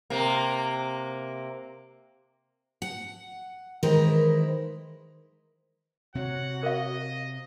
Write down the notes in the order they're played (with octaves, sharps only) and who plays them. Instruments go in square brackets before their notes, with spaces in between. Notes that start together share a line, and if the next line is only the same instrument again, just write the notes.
[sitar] C3 A#3
[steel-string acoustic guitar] F#5
D#3 E3 G#3 E4 A#4 C5
[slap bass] C3 C4 [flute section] F#4 C#5 [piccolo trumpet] F#5
[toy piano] A#4 F5 [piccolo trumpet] D#5